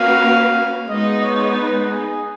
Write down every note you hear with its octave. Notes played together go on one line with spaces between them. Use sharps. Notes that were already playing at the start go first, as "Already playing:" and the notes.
Already playing: A#3 C#4 F#4 B4 F5
G#3 B3 D#4 D#5
C#5
B4
G#4